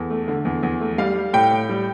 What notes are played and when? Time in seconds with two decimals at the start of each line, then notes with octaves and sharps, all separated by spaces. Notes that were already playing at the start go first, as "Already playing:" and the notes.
Already playing: E2 A4
0.10 A3
0.28 D3
0.45 E2
0.63 E2
0.81 A3
0.98 G3 F5
1.15 G3
1.33 A2 G5
1.51 A2
1.69 G3